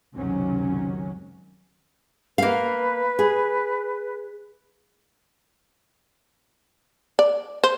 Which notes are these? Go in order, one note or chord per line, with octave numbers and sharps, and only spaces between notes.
C#2 F#2 C3 D#3 F#3 C#4
A#3 B4 F5
G#4
D5
C5